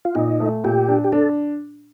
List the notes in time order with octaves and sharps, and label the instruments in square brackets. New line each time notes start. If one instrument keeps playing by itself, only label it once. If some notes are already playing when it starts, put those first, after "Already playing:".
[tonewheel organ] F4
[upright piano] A#2 [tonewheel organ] D#4
[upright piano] A3
[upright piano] A#2 [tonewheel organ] G4
[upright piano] D4
[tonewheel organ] G4
[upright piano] D4 [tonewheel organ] A4